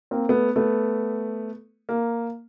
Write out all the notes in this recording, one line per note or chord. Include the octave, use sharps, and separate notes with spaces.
A#3 C4
A3 B3
A3 B3
A#3